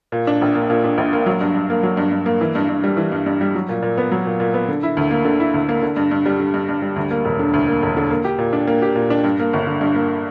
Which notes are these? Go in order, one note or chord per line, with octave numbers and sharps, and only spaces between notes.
A#2
D4
A#1
A#3
A#2
D4
A#1
A#3
F#3
G2
G2
A#3
F#3
G2
G2
A#3
E3
G2
G2
G3
E3
G2
G2
G3
F#3
A#2
A#2
B3
F#3
A#2
A#2
B3
D3
E4
D2
A#3
D3
E4
D2
A#3
D3
G2
G2
G3
D3
G2
G2
G3
D2
A#3
E1
D3
D2
A#3
E1
D3
A#3
G4
A#2
D4
A#3
G4
A#2
D4
G2
A#3
G1
D3
G2
A#3